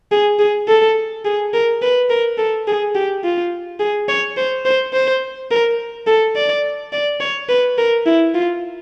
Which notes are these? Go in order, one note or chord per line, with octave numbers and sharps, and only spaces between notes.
G#4
G#4
A4
G#4
A#4
B4
A#4
A4
G#4
G4
F4
G#4
C#5
C5
C5
C5
A#4
A4
D5
D5
C#5
B4
A#4
E4
F4